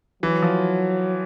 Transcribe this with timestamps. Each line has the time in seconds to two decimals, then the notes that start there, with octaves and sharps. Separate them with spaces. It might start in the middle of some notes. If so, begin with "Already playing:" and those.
0.23 E3 F#3
0.42 F3